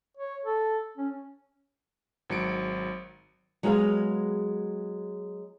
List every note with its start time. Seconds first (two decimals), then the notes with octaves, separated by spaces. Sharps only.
0.17 C#5
0.45 A4
0.98 C#4
2.30 G#1 F#3 C#7 D7
3.63 F#3 G#3 B3 G#4 F5